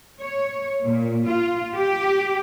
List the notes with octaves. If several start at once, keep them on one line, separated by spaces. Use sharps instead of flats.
C#5
A#2
F4
G4